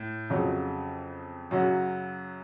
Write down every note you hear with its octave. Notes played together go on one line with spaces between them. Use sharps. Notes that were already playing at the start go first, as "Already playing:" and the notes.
Already playing: A2
F2 C#3 F#3
F#2 C#3 F#3 C#4 F#4